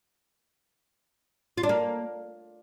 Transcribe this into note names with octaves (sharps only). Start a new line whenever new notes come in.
F4
D4
A#3